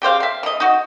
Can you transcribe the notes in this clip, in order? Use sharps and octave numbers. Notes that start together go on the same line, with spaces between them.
C#3 G4 C5 F5
E5 F5
E3 D#5
D#4 F#4